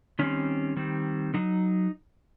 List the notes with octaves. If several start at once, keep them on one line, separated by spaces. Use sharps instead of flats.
D#3 G3 C4 C#4
D#3 G3 C4
D3 F#3 D#4